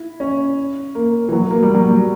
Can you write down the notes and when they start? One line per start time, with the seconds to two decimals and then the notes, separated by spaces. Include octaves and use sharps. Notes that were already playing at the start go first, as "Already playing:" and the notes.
Already playing: E4
0.20 C#4
0.95 A#3
1.29 E3
1.33 F#3
1.51 A#3
1.63 G3
1.75 F#3
1.88 G3